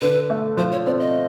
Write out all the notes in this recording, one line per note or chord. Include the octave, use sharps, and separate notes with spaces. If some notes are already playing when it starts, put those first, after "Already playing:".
D3 B4
A3
F3 C5
C#5
C4 D5
D#5